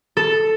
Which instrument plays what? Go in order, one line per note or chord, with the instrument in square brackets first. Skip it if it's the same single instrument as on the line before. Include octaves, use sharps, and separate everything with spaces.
[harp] A4